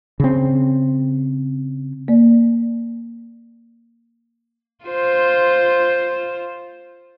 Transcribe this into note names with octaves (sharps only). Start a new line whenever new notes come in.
C#3 C4
A#3 D5
F4 C5